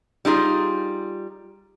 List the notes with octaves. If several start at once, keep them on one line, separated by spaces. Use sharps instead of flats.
G3 D#4 F4 G#4